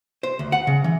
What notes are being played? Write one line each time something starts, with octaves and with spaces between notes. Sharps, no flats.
C5
D2
F#5
C#3
E3